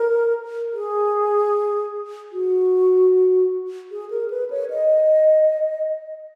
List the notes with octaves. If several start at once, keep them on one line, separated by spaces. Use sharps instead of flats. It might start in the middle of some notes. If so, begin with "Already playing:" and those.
Already playing: A#4
G#4
F#4
G#4
A#4
B4
C#5
D#5